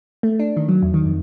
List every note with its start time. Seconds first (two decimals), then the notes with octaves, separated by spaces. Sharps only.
0.23 A3
0.39 D4
0.57 D#3
0.69 F#3
0.83 E2
0.94 D#3
1.06 F2